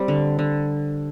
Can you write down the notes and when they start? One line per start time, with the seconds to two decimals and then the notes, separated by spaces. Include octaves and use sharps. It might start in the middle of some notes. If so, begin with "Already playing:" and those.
Already playing: G3 C4
0.08 D3
0.39 D3